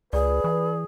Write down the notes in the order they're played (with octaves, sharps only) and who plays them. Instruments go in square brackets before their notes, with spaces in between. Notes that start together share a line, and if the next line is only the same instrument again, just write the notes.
[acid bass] C#2 [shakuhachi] G#4 [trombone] B4 [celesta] D5
[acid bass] E3